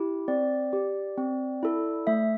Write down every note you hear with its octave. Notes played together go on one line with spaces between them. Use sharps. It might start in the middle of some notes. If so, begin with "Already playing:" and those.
Already playing: E4 G4
C4 D5
G4
C4
E4 A4
A3 E5